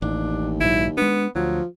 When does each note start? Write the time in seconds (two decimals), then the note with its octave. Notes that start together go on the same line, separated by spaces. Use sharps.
0.02 A1 D#2 D4
0.61 A#1 G#2 F#3 E4
0.97 G#3 B3 D4
1.35 D2 F3 F#3